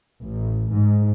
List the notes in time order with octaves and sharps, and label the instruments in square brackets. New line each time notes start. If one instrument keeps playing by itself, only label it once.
[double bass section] A1
G#2